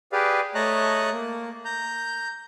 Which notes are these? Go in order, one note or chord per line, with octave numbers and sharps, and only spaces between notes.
G4 G#4 B4 D5 F5
A3 C#5 D#5 A5 A#5 F#6
A#3
A#5 G6